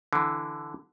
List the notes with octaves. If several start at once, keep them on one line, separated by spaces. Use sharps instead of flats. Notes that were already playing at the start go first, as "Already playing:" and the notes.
D3 E3